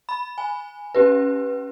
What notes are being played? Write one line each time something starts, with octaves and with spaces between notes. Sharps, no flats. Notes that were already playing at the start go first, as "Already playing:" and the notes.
B5
G#5
C#4 G4 B4